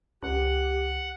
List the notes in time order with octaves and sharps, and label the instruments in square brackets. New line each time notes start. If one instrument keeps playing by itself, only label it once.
[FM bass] C#2 [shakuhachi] G4 [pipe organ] F#5